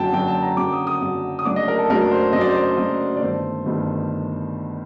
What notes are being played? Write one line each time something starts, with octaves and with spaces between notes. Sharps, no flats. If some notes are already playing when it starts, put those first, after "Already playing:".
Already playing: F#1 F#2 D3 F#3 G5 A5
F#1 F#2 D3 F#3 G5
A5
A#5
F#1 F#2 D3 F#3 D6
D#6
D#6
F#1 F#2 D3 F#3
D#6
F#1 F#2 F#3 A3 D4 D6
D#5
A#4
A4
F#1 F#2 F#3 A3 D4 A#4
C5
F#1 F#2 F#3 A3 D4 D#5
D5
C5
D5
F#1 F#2 F#3 A3 D4 D#5
D5
G1 G2 D#3 A3 C5
G1 G2 D#3 A3